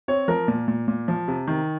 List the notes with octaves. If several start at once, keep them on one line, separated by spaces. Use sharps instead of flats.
C4 C#5
F3 A#4
A#2
A#2
A#2
F3
C3
D#3